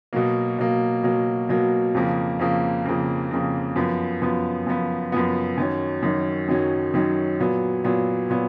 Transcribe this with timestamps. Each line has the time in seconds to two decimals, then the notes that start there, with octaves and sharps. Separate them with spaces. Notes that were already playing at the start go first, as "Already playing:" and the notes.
0.13 B2 F#3 A#3
0.58 B2 F#3 A#3
1.03 B2 F#3 A#3
1.49 B2 F#3 A#3
1.94 F2 C#3 F3 A#3
2.39 F2 C#3 F3 A#3
2.85 F2 C#3 F3 A#3
3.31 F2 C#3 F3 A#3
3.76 F#2 F3 B3
4.22 F#2 F3 B3
4.67 F#2 F3 B3
5.12 F#2 F3 B3
5.58 F#2 D#3 F#3 C#4
6.03 F#2 D#3 F#3 C#4
6.48 F#2 D#3 F#3 C#4
6.94 F#2 D#3 F#3 C#4
7.40 A#2 F#3 B3
7.84 A#2 F#3 B3
8.30 A#2 F#3 B3